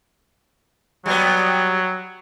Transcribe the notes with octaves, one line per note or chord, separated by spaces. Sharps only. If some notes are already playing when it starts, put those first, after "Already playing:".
F#3 G3 B3